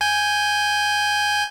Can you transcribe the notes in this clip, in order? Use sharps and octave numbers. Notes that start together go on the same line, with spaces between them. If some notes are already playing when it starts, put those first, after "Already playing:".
G#5 G6